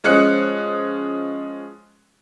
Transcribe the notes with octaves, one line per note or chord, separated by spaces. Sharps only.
F3 G#3 C#4 F#6 C#7